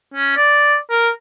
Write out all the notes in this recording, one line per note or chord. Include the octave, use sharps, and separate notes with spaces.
C#4
D5
A#4